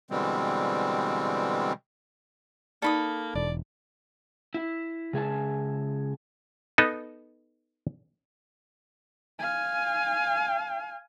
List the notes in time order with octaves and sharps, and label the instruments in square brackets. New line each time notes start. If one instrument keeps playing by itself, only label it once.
[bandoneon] B2 D3 E3 G3 G#3 C4
[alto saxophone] A#3 [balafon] D#4 D5 [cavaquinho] A4 B5 D#6
[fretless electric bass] E1 [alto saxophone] D5
[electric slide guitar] E4
C#3 G#3 G#4 E5 G#5 A5
[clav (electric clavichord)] B3 D#4 A4
[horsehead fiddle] F5 G#5